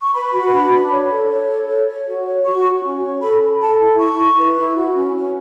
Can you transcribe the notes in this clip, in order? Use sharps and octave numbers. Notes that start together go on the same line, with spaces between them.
C#6
B4 B5
F#4
D4
D4
C#5
A4
C#5
A4
C#5
C#5
F#4
C#5
F#4 C#6
F#4
C#4
C#5
A4 B5
A4
A4 A5
E4
E4 C#6
E4
B4
E4
F#4
C#4
C#4